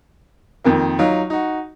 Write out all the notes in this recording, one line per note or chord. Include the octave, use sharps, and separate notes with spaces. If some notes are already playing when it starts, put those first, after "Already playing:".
F2 D#3 A#3
F#3 D#4 F4
D#4 F#4